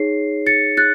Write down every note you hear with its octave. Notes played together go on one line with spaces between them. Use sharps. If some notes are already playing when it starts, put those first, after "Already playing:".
Already playing: D#4 G#4 C#5 C7
A6 C#7
F#6 A6